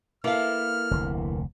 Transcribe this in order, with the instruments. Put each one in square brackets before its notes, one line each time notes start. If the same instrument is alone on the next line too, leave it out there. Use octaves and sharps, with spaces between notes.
[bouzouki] A#3 B3 A4 [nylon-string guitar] E4 F5 [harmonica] F6
[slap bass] F1 D2 C3